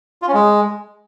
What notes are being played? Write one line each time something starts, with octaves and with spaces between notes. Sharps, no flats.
F4
C#4
G#3